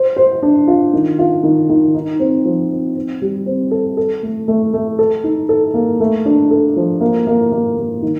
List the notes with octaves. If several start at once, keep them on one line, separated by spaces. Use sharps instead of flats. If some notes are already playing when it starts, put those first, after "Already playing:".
Already playing: C5
C5
D4
F4
D#3
F4
D#3
D#3
D#4
C4
F3
C4
C4
G3
C4
A4
A4
A3
A3
A3
A4
D#4
A4
A#3
A3
D4
A4
F3
A#3
A#3
A#3
A#3
D#3